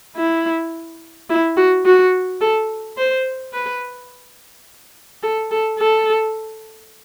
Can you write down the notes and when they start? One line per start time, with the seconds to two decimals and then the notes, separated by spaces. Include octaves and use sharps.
0.16 E4
1.30 E4
1.57 F#4
1.86 F#4
2.41 A4
2.98 C5
3.54 B4
5.23 A4
5.51 A4
5.79 A4